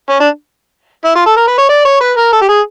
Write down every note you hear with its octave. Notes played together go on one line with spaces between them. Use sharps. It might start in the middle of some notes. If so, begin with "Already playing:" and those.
C#4
D4
E4
F4
A4
A#4
B4
C#5
D5
C#5
B4
A#4
A4
G4
G#4